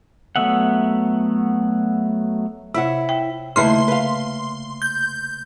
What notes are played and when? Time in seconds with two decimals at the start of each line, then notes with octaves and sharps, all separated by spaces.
0.36 F#3 A3 B3 E5 F#5
2.74 C3 E4 C#5 F#5
3.09 G5
3.56 D#2 C#3 A3 A#3 E4 B4 C6
3.88 B4 F5
4.82 G6